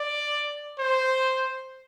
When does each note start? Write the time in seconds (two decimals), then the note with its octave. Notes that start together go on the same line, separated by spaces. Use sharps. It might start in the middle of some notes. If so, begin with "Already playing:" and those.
Already playing: D5
0.79 C5